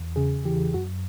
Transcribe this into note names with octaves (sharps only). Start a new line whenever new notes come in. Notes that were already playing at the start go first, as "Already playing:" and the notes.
Already playing: E2
C#3 G#4
E3 G4
F#2 F#4